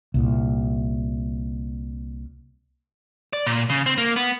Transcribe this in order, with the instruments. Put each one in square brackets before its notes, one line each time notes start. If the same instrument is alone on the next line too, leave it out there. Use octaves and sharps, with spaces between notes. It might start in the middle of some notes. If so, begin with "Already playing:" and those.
[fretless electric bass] C2 A#2
[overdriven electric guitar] D5
A#2
C#3
C4
A#3
B3